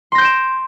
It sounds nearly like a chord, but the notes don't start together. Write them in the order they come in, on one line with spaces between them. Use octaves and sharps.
C6 A#6 G6 D7 E7